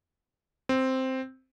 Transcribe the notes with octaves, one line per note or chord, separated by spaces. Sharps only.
C4